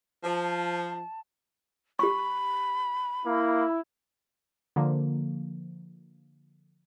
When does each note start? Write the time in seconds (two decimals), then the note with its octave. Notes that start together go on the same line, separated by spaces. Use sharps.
0.24 F3 A5
1.99 G4 B5 C#6
3.25 A#3 E4
4.76 D3 F3 A#3